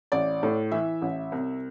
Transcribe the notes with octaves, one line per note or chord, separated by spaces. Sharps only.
A1 D5
A2
E3 E5
A1
C2